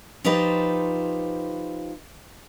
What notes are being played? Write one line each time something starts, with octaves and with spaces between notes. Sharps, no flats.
F3 D#4 F4 G4 B4 C5